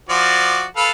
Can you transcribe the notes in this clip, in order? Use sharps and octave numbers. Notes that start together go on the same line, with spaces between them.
F3 F#4 D5
A4 B4 F5